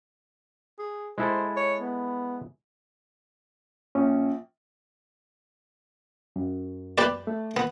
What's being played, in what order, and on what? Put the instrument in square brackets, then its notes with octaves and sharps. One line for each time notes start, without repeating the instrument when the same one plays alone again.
[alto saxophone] G#4
[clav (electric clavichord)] G#3 E4 A4 [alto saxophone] C5
[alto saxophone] C#5
B3
[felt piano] A#1 [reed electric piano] C#4
[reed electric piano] F#2
[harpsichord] G4 B4 D5
[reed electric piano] A3
[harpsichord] B3